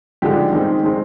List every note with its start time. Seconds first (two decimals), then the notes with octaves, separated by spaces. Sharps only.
0.22 D3 F3 G#3 D#4 G4
0.53 D#3 G#3 C4 D#4
0.83 D#3 G#3 C4 D#4